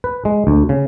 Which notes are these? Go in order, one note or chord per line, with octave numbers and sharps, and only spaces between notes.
B4
G#3
D2
C#3